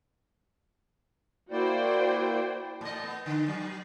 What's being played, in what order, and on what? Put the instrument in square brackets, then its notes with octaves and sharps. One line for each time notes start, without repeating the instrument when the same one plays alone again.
[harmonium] A#3 E4 D5 [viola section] F#4 C5 G5
[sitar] A2 D#5
B3
D3
F#3